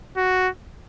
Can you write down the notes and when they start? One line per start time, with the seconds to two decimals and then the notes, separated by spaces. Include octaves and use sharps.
0.17 F#4